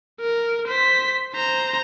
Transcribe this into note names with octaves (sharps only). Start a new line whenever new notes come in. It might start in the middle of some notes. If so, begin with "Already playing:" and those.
A#4
C5 B6
C5 A#5